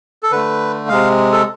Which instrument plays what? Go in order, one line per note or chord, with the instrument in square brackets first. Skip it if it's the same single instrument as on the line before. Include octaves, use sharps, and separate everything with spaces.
[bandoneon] A4
D3 A3 B4
C3 G#3 F5
A4